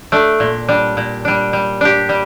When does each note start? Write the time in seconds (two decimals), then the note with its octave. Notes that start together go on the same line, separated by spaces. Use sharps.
0.12 A3 D4
0.40 A#2
0.69 G3 D4
0.97 A#2
1.25 G3 D4
1.53 G3
1.81 D4 G4
2.09 G3